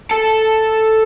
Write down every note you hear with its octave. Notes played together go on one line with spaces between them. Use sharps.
A4